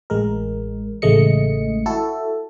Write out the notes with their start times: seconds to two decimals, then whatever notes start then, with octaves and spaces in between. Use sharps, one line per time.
0.10 A1 G#3 A#4
1.02 A1 C#3 G#3 A3 D#5 C#7
1.86 E4 F#4 A4